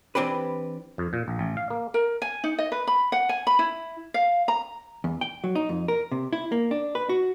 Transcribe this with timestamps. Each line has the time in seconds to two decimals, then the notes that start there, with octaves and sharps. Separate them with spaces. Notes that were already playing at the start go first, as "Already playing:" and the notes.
0.15 E3 C4 D4 G4 B4
0.98 F2
1.13 A#2
1.28 A#1
1.39 A1
1.57 F5
1.70 A#3
1.94 A#4
2.22 G#5
2.44 D#4
2.58 D#5
2.72 B4
2.87 B5
3.12 F#5
3.29 G#5
3.47 B5
3.59 E4
4.14 F5
4.48 A#5
5.04 E2
5.21 G5
5.44 F#3
5.55 D#4
5.69 F2
5.88 A#4
6.11 C3
6.33 E4
6.52 A#3
6.71 D4
6.95 B4
7.09 F#4